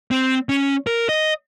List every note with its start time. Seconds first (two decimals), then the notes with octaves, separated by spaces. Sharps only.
0.11 C4
0.49 C#4
0.87 A#4
1.09 D#5